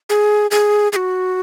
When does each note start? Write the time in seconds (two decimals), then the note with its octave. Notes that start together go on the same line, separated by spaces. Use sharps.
0.10 G#4
0.51 G#4
0.93 G#4
0.96 F#4